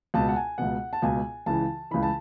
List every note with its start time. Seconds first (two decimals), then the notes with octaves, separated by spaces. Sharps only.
0.14 C#2 B2 A5
0.29 F#5
0.36 G#5
0.58 C#2 B2 F#5
0.93 A5
1.02 C#2 B2 G#5
1.46 C#2 C#3 E3 A5
1.91 C#2 C#3 E3 B5
2.03 A5